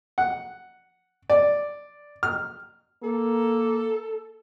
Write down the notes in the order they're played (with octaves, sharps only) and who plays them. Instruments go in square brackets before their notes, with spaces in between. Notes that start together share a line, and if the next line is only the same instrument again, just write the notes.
[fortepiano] F#5
D5
F6
[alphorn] A#3 [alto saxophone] A4